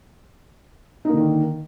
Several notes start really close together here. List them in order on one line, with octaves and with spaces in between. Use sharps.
D#4 A#3 D3 D#3